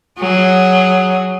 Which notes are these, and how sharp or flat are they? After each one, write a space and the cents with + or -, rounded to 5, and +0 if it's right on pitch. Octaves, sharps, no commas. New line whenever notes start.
F#3 +5 G#4 +0